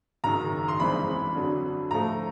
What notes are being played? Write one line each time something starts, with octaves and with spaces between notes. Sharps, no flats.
F#1 F#2 D#3 A#5
C6
A1 G2 E3 G#3 C4 B5
F2 D3 F#3
A2 F3 A3 A#5